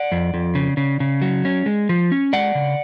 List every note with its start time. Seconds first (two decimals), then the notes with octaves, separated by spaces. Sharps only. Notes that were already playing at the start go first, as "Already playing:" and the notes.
Already playing: D5 F#5
0.12 F2
0.34 F2
0.55 C#3
0.77 C#3
1.00 C#3
1.22 F#3
1.45 C#4
1.66 G#3
1.89 F3
2.12 C#4
2.33 G#3 D5 F#5
2.55 C#3